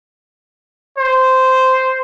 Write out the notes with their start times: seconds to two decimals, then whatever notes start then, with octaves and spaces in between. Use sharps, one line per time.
0.98 C5